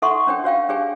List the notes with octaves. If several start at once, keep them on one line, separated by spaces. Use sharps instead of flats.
D#4 A4 E5 F#5 C6 C#6
C#4 D4 C#5 G5
F#4 C#5 F5 G5
D4 G4 G#4 C#5 G5 G#5